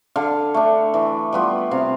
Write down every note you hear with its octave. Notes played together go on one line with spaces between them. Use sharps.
D3 F5
A3 D4
E3
G3 B3 F4
C3 F5